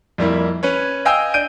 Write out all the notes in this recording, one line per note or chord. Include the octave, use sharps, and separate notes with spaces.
F2 G3 A#3 E4
C#4 B4 C#5
D#5 F5 G5 G#5 E6 G6
D4 G6 D7 D#7